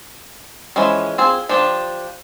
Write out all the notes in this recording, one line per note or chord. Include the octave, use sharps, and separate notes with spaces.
E3 F3 G#3 C#4
C4 F4 G#4
F3 D4 G4